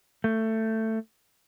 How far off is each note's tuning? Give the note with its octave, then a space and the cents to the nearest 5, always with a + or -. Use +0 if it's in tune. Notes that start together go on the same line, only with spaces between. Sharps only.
A3 +15